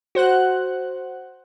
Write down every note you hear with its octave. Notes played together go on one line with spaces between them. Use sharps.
F#4 C5 F#5 F#6